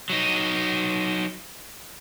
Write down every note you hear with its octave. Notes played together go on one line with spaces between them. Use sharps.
F#3 D#4